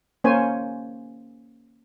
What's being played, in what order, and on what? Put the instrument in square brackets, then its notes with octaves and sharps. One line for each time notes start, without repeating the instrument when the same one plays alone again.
[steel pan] A#3 C#4 C5 C#5 G#5